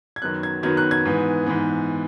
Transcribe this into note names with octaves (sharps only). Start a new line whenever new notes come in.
G#6
F#2 D#3 F#3 B3 F#6
G#6
F#2 D#3 F#3 B3 G#6
F#6
G#6
G#2 E3 B3
G#2 E3 B3